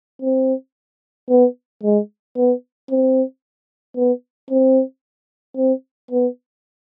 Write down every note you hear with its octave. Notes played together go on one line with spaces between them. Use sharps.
C4
B3
G#3
B3
C4
B3
C4
C4
B3